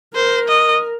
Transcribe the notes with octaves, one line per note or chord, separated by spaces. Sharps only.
A#4 C5
D#5